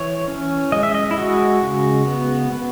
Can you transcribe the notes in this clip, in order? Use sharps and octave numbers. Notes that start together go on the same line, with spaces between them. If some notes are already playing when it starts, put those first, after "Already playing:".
Already playing: E3 C#5
C#4
G#3 D#5
E5
D#5
E4
G#3 F#4
C#3
B3
B3